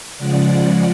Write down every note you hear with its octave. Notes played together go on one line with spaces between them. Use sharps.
C#3 F3 G#3 D5 F#5